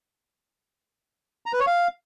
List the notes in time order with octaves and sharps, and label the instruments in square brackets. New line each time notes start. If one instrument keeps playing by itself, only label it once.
[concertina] A#5
B4
C#5
F5